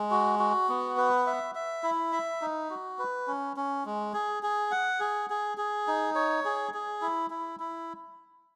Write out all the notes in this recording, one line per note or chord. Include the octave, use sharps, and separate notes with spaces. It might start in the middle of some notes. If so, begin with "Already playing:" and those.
Already playing: G#3
F#4
F#4
B3
B4
E5
E5
E4
E5
D#4
F#4
B4
C#4
C#4
G#3
G#4
G#4
F#5
G#4
G#4
G#4
D#4
C#5
G#4
G#4
E4
E4
E4